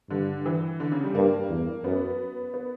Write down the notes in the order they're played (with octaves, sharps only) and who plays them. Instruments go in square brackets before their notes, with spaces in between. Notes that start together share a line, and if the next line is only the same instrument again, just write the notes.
[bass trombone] G2 [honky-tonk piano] D3
[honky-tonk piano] E3
D3
C#3
G3
[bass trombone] G2 [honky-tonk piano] A#3
[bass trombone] E2
[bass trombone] F#2 [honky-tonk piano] B3
[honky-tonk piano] B3